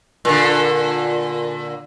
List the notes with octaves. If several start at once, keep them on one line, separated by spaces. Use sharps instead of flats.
A#2 D3